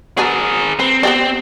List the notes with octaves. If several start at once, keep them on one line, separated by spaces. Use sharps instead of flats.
F#3 B3 D4 G#4 A#4
C4 B4
B3 C4 G4 D5